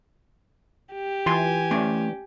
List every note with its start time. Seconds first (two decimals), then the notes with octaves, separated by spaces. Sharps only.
0.94 G4
1.26 E3 F4 G#5 C6
1.71 A3 C#4 D5